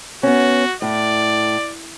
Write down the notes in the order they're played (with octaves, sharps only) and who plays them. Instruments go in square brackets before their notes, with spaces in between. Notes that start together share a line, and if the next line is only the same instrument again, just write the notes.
[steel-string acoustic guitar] B3 C#4 [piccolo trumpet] F#4
[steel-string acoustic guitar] A2 [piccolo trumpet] D5